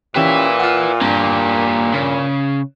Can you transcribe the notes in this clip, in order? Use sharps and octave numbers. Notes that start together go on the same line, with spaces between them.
A#2 E3 C#4 G4 B4 E5
F4 F#5
G2 A#3 G4
C#3